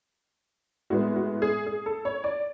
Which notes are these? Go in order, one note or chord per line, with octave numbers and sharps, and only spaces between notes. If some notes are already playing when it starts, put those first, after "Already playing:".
A2 G#3 B3 F#4
F#4
G#4
G#4
A4
C#5
D5